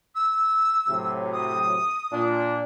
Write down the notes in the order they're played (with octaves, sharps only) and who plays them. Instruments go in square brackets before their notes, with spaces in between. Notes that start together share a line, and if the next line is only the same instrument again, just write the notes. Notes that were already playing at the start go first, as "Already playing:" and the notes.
[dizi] E6
[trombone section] A2 C3 F#3
[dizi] D#6
[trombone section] A#2 D4